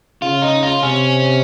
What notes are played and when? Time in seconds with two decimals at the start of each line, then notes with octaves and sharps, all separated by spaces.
0.22 C#3 F4
0.42 D#4
0.63 F4
0.82 C3 C#4